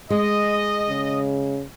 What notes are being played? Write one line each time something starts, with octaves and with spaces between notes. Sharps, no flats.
G#3 D#5
C#3